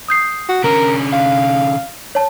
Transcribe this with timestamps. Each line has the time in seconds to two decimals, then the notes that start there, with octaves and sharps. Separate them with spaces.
0.08 D#6 G6 C7
0.49 F#4
0.64 D3 C#4 A#4
1.13 F5
2.15 C#5 A5